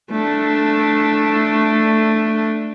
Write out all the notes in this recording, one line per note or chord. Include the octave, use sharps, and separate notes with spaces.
A3 D4